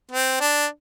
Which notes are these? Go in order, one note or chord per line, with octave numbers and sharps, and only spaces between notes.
C4
D4